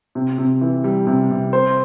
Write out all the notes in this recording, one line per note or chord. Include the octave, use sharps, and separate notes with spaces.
C3
C3
E3
G3
C3
C3
C5